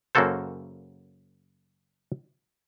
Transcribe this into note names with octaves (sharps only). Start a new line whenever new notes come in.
F#2 C#3 A#3 F#4 A4 C5